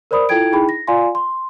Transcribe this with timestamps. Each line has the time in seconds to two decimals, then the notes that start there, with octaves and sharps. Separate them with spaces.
0.11 A#4 C5 D5 B5 D#6
0.29 E4 F4 A4 G5 G#6 D7
0.52 D#4 E4 G#4 G5 B5
0.69 A#6
0.87 F4 D5 F5 G#5 C6
1.15 C6